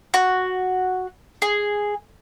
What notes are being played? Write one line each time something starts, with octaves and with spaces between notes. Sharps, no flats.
F#4
G#4